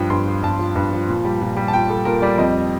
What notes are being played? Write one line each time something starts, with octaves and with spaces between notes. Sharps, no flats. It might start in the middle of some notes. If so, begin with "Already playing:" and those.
Already playing: G2 F3 G5
G2 C6
F3
G2 A5
F3
G2
F3
A#2
G3
A#2
G3
A5
A#2 G5
G3 A4
A#2 A#4
G3 D5
F2 D#5